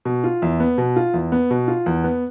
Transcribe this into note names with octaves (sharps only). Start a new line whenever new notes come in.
B2
F4
E2
B3
B2
F4
E2
B3
B2
F4
E2
B3